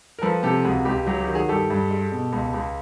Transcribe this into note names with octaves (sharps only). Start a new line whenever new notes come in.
A#4
F3 A4 B4
C3 G4 A4
C#2 F#4 G#4
C#2 G4
F#3 G4
G4
D#3
F#4 G#4
G2 G4 A4
G2
G#3
B2
C#2
C#2